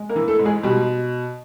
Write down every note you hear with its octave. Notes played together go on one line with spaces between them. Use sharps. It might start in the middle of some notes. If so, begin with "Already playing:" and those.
Already playing: G#3
A#3 A#4
E3
A3 A4
G#2
G#3 G#4
B2 G3 G4